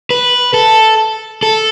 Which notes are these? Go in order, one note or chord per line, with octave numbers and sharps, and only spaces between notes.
B4
A4
A4